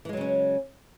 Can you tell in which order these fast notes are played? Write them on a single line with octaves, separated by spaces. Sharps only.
E3 G#3 F#3 C#3 C#4